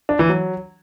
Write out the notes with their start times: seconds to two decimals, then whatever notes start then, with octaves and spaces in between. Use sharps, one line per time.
0.09 D4
0.19 E3
0.29 F#3